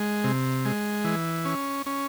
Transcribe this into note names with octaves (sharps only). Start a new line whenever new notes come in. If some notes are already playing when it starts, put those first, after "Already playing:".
Already playing: G#3
C3
G#3
E3
C#4
C#4